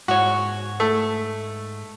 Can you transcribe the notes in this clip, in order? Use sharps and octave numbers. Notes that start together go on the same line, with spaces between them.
G#2 F#4 C#5
A3